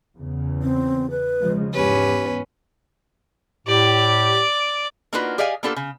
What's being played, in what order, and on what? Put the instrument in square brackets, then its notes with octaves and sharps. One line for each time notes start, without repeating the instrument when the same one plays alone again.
[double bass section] E2 C#3
[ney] C4
B4
[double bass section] C#3 F3 G#3
[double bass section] E2 G#2 B3 [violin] C#4 B4 [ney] G4
[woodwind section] A2 G4 [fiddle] D5
[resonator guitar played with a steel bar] A#3 D4 D#4 F4 F#4 B4
G4 G#4 D5 D#5 F5 G#5
A#3 B3 D4 F4 G4 A4
C#3